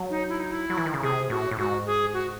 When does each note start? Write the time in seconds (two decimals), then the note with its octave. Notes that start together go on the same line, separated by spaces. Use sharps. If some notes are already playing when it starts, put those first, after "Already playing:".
Already playing: F#3
0.10 D#4
0.29 E4
0.39 D#4
0.51 E4
0.70 F#3
0.77 E3
0.86 D#3
0.94 C#3
1.02 C3 G#4
1.30 A2 F#4
1.51 A2
1.58 G#2 F#4
1.86 G#4
2.13 F#4